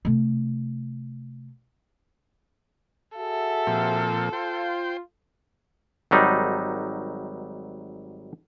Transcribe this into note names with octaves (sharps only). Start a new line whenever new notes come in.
C3 A3
F#4 G#4 A4 E5
A#2 F3 C4
F4 C5 G5
G#1 F#3 G3 D#4